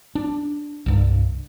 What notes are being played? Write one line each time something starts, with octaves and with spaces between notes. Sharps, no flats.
D4
C2 G2